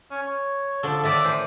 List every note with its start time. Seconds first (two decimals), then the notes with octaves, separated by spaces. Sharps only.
0.11 C#4
0.22 C#5
0.83 D3 F3 A4
1.04 A2 D#3 D5 E5
1.25 E3 C5